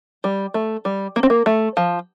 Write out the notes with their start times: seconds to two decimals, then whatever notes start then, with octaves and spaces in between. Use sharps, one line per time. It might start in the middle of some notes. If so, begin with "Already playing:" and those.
0.24 G3
0.54 A3
0.85 G3
1.16 A#3
1.23 C4
1.30 A#3
1.46 A3
1.77 F3